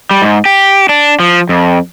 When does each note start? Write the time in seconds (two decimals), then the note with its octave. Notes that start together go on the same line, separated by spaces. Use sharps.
0.11 G3
0.22 G#2
0.45 G4
0.89 D4
1.20 F3
1.49 F2